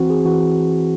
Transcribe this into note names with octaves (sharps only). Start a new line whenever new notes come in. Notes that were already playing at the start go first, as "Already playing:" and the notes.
Already playing: E3 C4 F#4
G#4
E3 F#4